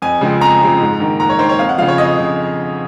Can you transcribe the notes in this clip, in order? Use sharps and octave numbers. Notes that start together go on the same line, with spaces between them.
F2 G#5
C#3 F3 G#3 C4
F2 A#5
C#3 F3 G#3 C4
G#2
D#3 A#3
G#2 A#5
C#5
D#3 A#3 C5
C#5
F2 F5
F#5
C#3 F3 F5
C#5
F2 D#5
C#3 F3